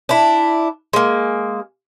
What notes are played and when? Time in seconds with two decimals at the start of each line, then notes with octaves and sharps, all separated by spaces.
0.09 D4 E4
0.93 G#3 A#3